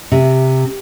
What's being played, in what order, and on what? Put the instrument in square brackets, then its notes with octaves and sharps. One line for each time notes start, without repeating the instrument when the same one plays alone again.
[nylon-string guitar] C3